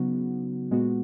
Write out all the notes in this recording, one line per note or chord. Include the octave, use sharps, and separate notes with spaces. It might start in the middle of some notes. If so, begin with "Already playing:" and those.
Already playing: C#3 F#3 B3 D#4 F#4
A#2 G#3 B3 F#4